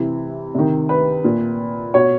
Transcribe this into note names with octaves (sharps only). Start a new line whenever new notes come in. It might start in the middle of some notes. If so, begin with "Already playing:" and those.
Already playing: C3 E3
C3 D#3
B4
A#2
B2 C#5